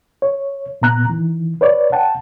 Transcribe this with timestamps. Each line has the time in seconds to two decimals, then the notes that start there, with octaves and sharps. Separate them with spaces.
0.22 C#5
0.82 A#2 B3 A#5 F#6
1.10 D#3 E3
1.61 B4 C#5 D5
1.92 F#5 G5 A5